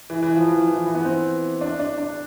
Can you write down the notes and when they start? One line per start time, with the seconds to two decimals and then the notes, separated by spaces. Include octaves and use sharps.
0.10 E3
0.22 E3
0.35 F3
0.48 E3
0.67 E3
0.85 E3
0.95 B3
1.05 C4
1.61 D4
1.79 D4
1.98 D4